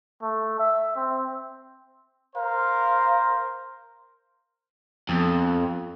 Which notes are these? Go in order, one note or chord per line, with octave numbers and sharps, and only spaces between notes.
A3
E5
C4
A#4 C5 F5
F2 F3 B3